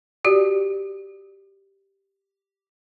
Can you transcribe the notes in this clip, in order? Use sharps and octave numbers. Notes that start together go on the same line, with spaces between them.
F#4 G4 D5